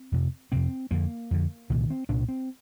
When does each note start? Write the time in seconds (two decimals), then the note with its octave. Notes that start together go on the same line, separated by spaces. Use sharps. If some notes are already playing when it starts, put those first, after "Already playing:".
Already playing: C4
0.12 F2 C3
0.52 F2 C3 C4
0.91 F2 D3 A#3
1.31 F2 D3
1.69 C2 A#2 D#3
1.90 C4
2.09 C2 A#2 D4
2.29 C4